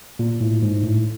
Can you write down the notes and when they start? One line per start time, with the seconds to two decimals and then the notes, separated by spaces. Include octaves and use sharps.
0.19 A#2
0.41 A2
0.62 G#2
0.84 A2